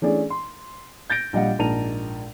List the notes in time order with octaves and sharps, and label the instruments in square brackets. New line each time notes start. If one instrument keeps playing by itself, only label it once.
[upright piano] E3 A3 C#4 D4 G#4 D5
C6
G6 A6 A#6 D7
A#1 G3 D#5 F5 F#5
A#1 G#2 A#4 A5 D#7 F7